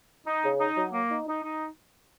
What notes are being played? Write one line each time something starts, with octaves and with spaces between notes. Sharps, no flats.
D#4
C#3
D#4
F#3
A#3
D#4
D#4
D#4